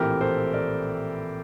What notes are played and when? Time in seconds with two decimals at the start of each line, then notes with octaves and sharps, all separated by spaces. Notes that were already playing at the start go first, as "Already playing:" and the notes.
Already playing: A#1 A2 E3 A3 C4 G4 A#4
0.21 A4 C5
0.54 A#4 D5